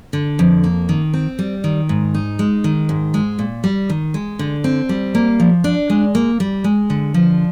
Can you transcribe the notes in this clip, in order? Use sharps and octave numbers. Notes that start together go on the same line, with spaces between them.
D3
F2
A#3
D#3
C4
G3
D#3
G#2
D#4
G#3
D#3
G#2
G#3
A#2
G3
D#3
G#3
D3
C4
G3
A#3
F3
D4
G#3
A#3
G3
G#3
D3
F3